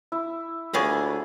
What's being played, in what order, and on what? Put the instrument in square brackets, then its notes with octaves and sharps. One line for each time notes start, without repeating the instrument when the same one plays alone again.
[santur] E4
[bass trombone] D2 [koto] A#3 B3 G#4 [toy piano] F4 C#5 C#6